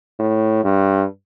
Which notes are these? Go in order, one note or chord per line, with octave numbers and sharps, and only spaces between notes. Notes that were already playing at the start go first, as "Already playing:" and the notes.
A2
G2